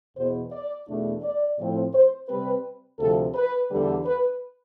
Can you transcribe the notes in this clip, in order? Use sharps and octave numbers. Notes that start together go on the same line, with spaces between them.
E2 B2 B3 C5
D5
E2 B2 A3 D4
D5
A2 F3 C4
C5
C3 G3 C4 B4
D2 C3 F3 A4
B4
E2 D3 G3
B4